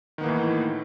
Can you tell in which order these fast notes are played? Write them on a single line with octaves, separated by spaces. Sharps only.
D#3 B3 A#3 E3 A2